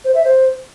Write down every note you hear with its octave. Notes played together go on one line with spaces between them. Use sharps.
C5
E5
C5